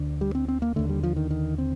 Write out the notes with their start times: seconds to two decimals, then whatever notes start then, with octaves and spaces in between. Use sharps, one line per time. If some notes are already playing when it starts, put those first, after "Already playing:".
Already playing: D2 D3
0.21 G3
0.35 C4
0.48 C4
0.62 A#3
0.76 D#2 D3 A3
0.89 G3
1.03 F3
1.16 D#3
1.31 D#3
1.58 C4